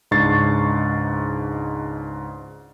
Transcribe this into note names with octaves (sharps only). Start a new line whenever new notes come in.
C#2 G#2 D4 C#6 A6 C7